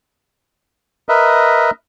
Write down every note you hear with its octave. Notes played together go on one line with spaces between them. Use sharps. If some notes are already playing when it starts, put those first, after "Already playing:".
A#4 B4 D#5 E5